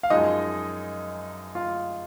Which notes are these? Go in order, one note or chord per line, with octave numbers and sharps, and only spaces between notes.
F5
F#2 F3 G#3 D#4 D#5
F4 F5